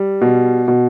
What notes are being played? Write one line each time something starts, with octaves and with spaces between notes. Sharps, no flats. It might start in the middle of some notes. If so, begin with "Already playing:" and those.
Already playing: G3
B2
B2